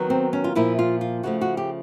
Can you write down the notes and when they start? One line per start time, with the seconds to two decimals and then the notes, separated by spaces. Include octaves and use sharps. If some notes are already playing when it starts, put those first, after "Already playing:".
Already playing: D#3 F#3 B3
0.10 C4
0.33 C#4
0.44 F4
0.55 A#2 F3 A#3 E4
0.79 F4
1.01 F4
1.23 C#3 F3 A3 F#4
1.41 F#4
1.57 G4